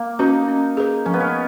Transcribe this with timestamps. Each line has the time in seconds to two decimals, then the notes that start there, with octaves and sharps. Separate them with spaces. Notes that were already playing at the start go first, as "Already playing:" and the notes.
Already playing: A#3
0.19 C#4 D#4 F#4 B4
0.48 C#4
0.77 G#4 B4
1.06 F3 C#4
1.14 B3
1.20 C#4